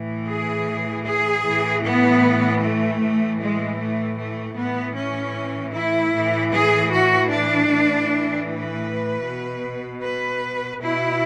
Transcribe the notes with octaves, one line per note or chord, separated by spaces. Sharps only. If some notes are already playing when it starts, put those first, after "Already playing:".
Already playing: A2 E3
G#4
G#4
A2 E3
B3
A3
A2 E3
G#3
A3
A3
A2 E3 B3
C#4
E4
A2 E3
G#4
F#4
D4
A2 E3
B4
B2
B4
B2 E4